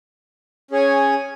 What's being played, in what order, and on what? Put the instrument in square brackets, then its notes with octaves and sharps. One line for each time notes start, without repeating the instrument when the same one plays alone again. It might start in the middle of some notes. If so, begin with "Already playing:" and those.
[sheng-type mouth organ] C#4 G#4 C#5 G#5